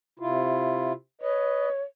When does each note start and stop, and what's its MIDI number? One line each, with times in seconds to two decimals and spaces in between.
0.19 0.93 48
0.19 0.93 64
0.19 0.93 65
1.21 1.69 71
1.21 1.82 73
1.21 1.69 75